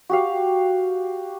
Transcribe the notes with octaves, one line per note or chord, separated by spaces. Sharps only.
F#4 G4 F5